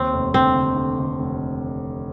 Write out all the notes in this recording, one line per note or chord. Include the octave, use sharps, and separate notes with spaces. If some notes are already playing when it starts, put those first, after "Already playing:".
Already playing: D#2 C4
F1
D3 C4
D3
D3
D3
F1